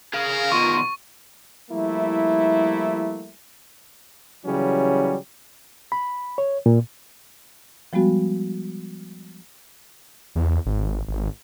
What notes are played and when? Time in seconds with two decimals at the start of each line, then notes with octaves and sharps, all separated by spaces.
0.14 G#4 A#4 F5
0.52 B2 D#3 F4 C#6
1.71 F3 G3 A3 A#3 E4
4.46 C#3 E3 F#3 G3 C#4
5.92 B5
6.38 C#5
6.66 A#2
7.93 F3 G3 G#3 B3 F#4
10.35 E2
10.66 G#1
11.08 G#1